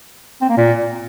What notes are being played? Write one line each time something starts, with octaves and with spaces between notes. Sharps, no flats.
C4
A#3
A#2